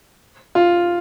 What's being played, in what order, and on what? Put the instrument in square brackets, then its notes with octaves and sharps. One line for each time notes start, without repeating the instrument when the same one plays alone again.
[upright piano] F4